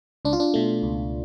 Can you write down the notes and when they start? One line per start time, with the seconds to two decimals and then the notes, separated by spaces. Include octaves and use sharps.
0.25 C#2 D4
0.33 F4
0.40 D4
0.54 B2 A3
0.83 C#2